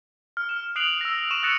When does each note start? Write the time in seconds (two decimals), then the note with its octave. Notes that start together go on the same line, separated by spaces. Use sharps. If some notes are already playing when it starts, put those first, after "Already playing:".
0.37 F6
0.49 F6 E7
0.76 D#6 F#6 C7 D7 F7 F#7
1.01 E6 A#6
1.31 C#6 D#7 E7
1.43 D#6 E6 F#6 A6 A#6 C#7